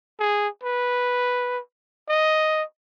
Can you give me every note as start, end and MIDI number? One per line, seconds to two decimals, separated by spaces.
0.19 0.48 68
0.63 1.59 71
2.09 2.63 75